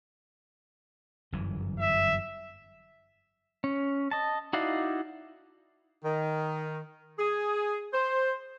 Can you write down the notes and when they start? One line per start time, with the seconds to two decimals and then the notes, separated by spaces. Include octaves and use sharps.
1.32 G1 F#2 E3
1.79 E5
3.64 C#4
4.11 D#5 A5
4.53 D#4 E4 F#4 D5 F5
6.05 D#3
7.19 G#4
7.94 C5